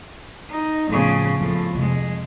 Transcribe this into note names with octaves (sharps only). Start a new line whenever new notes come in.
D#4
A2 C#3 F3
A2 F3 B3 C4
F2 C3 F3 G#3